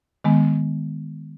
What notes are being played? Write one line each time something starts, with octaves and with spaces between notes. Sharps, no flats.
D#3 G#3 B3